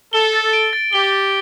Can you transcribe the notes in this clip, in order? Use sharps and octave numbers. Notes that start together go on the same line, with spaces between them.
A4 G7
A6
D7
A6
G4 G7
A6